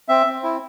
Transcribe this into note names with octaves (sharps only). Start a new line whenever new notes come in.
C4 E5
C4
E4